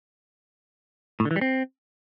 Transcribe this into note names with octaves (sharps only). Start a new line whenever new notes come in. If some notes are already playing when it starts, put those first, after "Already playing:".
A2
D3
E3
G3
C4